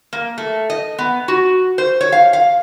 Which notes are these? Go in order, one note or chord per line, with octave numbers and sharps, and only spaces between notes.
A#3
A3
D#5
B3
F#4
C5
C#5
F5
F5